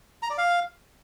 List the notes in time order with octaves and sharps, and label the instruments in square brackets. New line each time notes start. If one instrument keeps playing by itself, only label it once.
[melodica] A#5
D5
F5